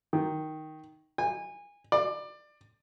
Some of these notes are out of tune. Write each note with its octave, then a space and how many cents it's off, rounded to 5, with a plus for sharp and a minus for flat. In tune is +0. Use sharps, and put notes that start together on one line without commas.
D#3 +5
G#5 -25
D5 +20